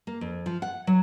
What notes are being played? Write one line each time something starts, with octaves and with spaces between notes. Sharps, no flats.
A#3
F2
F3
F#5
F#3